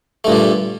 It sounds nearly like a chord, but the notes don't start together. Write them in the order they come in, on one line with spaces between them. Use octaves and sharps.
A3 G2 A#2 G3